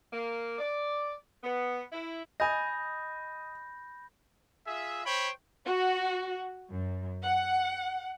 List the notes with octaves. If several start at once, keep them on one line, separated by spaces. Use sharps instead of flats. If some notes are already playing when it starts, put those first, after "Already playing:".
A#3
D5
B3
E4
D#5 G#5 B5 G6 A#6
F4 G#4 E5
C5 C#5 G5 B5
F#4
F#2
F#5